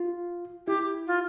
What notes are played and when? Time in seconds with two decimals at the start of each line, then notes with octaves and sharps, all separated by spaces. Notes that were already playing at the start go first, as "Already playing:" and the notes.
Already playing: F4
0.67 E4 G4
1.07 F4